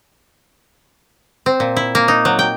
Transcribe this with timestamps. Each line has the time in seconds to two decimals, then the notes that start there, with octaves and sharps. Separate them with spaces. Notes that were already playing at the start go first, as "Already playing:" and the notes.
1.46 C4
1.60 A#2
1.77 E4
1.95 A#3
2.08 D#4
2.25 F#3
2.39 G5